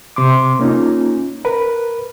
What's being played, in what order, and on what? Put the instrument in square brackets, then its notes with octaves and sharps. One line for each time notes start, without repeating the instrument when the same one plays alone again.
[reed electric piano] C3 C6 D6
A#3 C#4 D#4 F4
A#4 B4